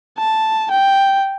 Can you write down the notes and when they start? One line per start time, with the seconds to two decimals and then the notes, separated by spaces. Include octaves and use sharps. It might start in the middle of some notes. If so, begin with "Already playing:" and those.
0.18 A5
0.71 G5